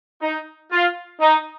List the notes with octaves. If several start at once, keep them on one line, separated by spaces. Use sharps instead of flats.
D#4
F4
D#4